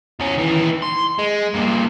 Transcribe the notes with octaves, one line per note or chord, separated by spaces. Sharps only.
E2 C#4
D#2 E3
C6
G#3
G2 A#2